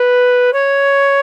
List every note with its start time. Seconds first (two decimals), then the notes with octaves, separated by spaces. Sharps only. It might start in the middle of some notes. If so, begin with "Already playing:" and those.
Already playing: B4
0.53 C#5